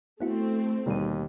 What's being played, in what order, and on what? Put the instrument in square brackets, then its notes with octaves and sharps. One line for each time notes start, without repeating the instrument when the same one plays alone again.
[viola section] A3 C4 [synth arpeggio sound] B3 E4 F#4
[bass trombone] D#2 [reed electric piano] B2 D#3 G3 [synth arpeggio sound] D3 D#7